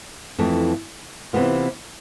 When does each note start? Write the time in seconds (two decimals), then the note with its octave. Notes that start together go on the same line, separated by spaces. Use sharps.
0.38 F2 E3 A3
1.33 C3 E3 B3 F4